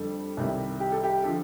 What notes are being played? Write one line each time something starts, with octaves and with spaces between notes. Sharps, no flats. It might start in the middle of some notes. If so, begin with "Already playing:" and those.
Already playing: F2 D3 G3 A4
C2 C3 D#3 G3
G4
A4
G4
D3 F3 A4